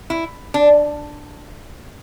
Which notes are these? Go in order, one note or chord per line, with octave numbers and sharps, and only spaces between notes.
E4
D4